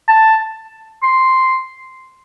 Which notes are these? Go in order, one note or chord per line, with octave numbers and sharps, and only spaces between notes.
A5
C6